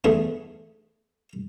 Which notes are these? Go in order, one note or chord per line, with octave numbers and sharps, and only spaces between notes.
E2 D3 A3 D4 G#4